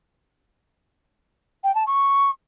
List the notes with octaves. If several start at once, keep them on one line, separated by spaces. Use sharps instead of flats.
G5
A5
C#6